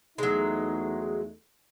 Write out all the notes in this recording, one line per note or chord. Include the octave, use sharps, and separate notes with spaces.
E2 F#3 G#3 A3 D#4